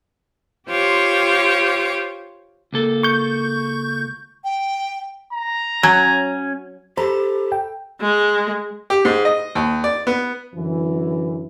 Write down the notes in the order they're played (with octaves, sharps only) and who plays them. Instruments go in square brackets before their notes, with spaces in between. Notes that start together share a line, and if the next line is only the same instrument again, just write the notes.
[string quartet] F4 G4 C5 C#5 D6
[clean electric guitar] C#2 A#3 A4
[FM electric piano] C#6 G6
[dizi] G5
[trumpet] A#5
[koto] F#3 [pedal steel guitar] C#4 G#5
[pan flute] G4 [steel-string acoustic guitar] A4 [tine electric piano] C5 A#5 B5
[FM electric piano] G5
[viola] G#3
[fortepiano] G4
G#2
D#5
D#2
D5
B3
[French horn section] F#2 D3 E3